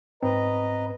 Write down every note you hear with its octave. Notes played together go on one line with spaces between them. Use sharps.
G#2 C4 B4 D#5 A#5